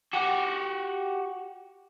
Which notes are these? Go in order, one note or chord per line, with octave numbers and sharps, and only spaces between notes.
F#4 G4